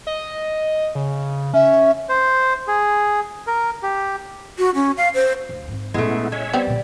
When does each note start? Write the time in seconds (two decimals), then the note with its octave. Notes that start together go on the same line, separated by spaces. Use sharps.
0.07 D#5
0.95 C#3
1.54 C#4 E5
2.09 C5
2.68 G#4
3.47 A#4
3.83 G4
4.58 F#4
4.75 C#4
4.97 F5
5.14 C5
5.49 D2
5.68 G#2 C4
5.94 A#2 G#3 A3 B3 C#4 E4
6.32 G#3 C#5 E5
6.53 G3 B3 C4
6.67 A#2 D3